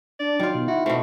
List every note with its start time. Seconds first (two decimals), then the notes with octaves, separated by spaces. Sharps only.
0.20 D4 D5
0.40 D#3 F#3 F4
0.55 B2
0.68 E4 F#4
0.86 B2 A3 C4